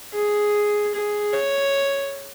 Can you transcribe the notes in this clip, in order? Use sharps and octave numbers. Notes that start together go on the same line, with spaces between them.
G#4
G#4
C#5